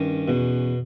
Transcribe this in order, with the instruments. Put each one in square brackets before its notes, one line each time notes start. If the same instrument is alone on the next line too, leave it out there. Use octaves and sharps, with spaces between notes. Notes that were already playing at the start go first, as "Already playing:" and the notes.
Already playing: [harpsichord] G2 D#3 C#4
E2 B2